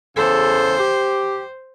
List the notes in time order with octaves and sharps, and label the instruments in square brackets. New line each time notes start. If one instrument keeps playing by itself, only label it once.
[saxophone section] E2 C#3 A4 [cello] C5
[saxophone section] G4